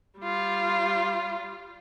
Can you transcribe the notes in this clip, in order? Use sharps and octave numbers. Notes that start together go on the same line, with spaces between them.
G3 F4